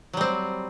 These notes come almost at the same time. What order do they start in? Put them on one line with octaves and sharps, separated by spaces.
F#3 G3 C4